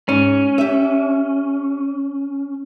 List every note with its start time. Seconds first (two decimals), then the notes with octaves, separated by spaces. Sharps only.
0.09 G#2 C#4
0.58 G4 E5